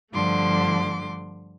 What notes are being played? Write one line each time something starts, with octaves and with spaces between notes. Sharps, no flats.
G2 D3 F3 A3 C6 D6